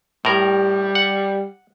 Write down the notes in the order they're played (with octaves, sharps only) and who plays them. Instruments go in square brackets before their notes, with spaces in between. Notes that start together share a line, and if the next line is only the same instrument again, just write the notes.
[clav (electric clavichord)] A2 A#4 [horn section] G3
[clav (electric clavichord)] F#5